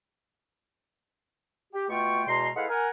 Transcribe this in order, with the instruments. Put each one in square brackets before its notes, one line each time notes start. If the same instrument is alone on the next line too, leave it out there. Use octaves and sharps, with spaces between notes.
[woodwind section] G4
B2 A3 F4 G5 C#6
E2 B2 G#3 A#5 C6
G#3 E4 A4 B4 F5 F#5
A#4 F#5 G#5